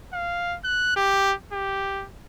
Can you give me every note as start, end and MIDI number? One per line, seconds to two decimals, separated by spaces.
0.13 0.57 77
0.64 0.94 90
0.96 1.34 67
1.53 2.06 67